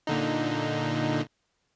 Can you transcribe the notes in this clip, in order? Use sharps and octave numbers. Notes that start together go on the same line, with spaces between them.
A#2 D3 D#4